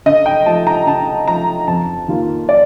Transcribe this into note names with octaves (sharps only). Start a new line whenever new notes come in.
D3 D#5
G5
F3 A3 A5
A#5
D3 A5
F3 A3 A#5
F2 A5
D#3 A#3 F4
D5